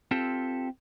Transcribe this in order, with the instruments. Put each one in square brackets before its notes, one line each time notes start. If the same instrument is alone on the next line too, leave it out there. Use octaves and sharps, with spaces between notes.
[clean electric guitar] C4 F4 G4 A4